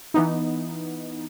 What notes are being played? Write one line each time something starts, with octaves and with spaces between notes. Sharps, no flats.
E3 B3 D#4